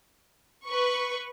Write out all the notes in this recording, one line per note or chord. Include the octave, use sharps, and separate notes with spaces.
B4 C#6